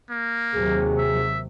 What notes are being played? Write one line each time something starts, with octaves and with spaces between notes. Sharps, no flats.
A#3
D#2 C3 F#3 G#4
E5